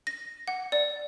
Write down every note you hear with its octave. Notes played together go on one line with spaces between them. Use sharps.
A#6
F#5
D5